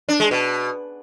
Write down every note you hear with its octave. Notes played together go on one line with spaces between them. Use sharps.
D4
G#3
B2